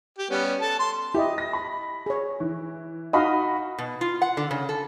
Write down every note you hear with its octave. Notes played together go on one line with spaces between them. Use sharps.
G4
G3 B3 C#4
A4 A5
C6
E4 G4 D#5
A#6
B5
G#4 C#5
E3
D#4 F#4 D#5 F5 B5
B2
F4
F#5
D3
C#3
A4